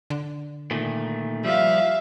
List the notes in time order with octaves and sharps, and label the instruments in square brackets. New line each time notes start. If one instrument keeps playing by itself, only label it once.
[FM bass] D3
[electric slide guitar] A#2 D#3 A3
[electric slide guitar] F3 G3 [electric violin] E5 F5